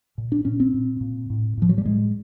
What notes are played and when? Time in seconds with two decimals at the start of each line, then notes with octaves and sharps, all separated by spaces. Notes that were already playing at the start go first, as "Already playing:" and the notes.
0.18 A#2
0.32 D4
0.45 A#2 C#4
0.60 C4
0.74 A#2
1.01 A#2
1.30 A2
1.57 A2 F3
1.69 F#3
1.78 G3
1.85 A2 G#3